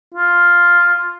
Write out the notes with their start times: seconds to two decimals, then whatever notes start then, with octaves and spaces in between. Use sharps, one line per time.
0.14 F4